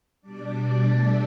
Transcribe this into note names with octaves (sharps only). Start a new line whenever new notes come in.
B2 G3 D4 D5
A3 A4